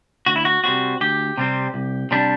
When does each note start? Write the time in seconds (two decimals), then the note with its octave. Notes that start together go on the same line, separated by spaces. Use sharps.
0.26 D2 F#4
0.36 E4
0.45 F#4
0.64 C3 G3 C4 F#4
1.01 D2 G4
1.37 C3 G3 C4
1.74 C2
2.11 C3 G3 D4